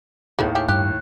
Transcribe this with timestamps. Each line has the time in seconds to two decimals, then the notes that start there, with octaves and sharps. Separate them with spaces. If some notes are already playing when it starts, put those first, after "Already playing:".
0.39 D#2 A2 D#3 G#3 A3 B3
0.55 E4 G4 G#4
0.69 G2 G4 F#6